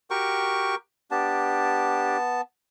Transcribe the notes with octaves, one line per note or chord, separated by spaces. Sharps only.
F#4 G4 A#4 G5 C#6
B3 D4 G4 A5